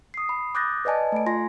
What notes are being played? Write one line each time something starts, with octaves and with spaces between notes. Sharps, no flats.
D#6 C7
B5
D6 D#6 F#6 G6 A6 A#6
B4 D5 D#5 G#5 A5
A3 D7
F4 G#5 C6 A#6